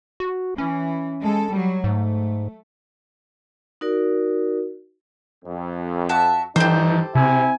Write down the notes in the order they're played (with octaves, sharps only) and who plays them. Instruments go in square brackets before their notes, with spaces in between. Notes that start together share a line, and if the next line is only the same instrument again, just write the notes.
[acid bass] F#4
[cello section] E3 [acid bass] C#4
[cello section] G#3 A4
F#3 G3
[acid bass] G#2 [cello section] A3
[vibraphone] D#4 F#4 A#4 D5
[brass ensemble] F2
[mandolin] F#4 E5 A5
[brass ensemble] G2 D3 D#4 [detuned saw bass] E3 [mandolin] G4 A4 C5
[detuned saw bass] C3 [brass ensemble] C4 E4 G#5